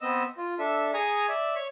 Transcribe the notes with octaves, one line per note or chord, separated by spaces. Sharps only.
B3 C4 D#5 E6
F4
D4 A4 E5
G#4 G#5 A#5 C#6 D#6
D5 E5
C#5 C#6